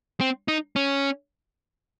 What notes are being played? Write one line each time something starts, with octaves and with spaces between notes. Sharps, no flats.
C4
D#4
C#4